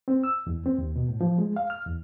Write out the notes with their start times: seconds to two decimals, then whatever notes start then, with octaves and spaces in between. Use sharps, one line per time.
0.08 C4
0.24 E6
0.47 E2
0.66 C4
0.79 D#2
0.96 B2
1.08 A2
1.21 F3
1.38 G#3
1.56 F5
1.70 F6
1.87 E2